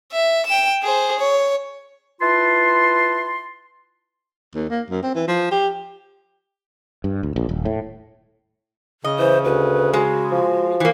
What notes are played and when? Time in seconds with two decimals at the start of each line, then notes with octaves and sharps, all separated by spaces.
0.12 E5
0.46 G5 E7
0.83 G#4 C5
1.19 C#5
2.21 E4 F4 B4 A5 C6
4.55 D#2
4.69 A#3
4.90 F#2
5.03 C4
5.15 E3
5.28 F3
5.51 G4
7.04 G2
7.23 D2
7.36 A#1
7.49 D#1
7.65 A2
9.04 C#3 D#5
9.19 E3 C5
9.45 D2 B4
9.93 G#3 F#4
10.32 F3
10.80 E3 A#3